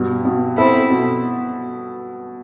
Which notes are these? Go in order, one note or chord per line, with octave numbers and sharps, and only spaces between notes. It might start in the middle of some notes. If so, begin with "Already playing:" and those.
Already playing: G2 B2
B2
C4 E4 A4
B2